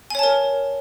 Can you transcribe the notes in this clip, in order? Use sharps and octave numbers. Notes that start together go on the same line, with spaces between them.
A#4 C#5 G#5 A5